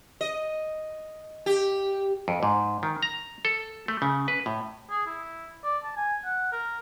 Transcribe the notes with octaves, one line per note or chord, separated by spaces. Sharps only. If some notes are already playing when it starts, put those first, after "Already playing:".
D#5
G4
F2
G#2
D#3
A#5
A4
A3
C#3
B4
A2
G#4
E4
D5
A5
G#5
F#5
A#4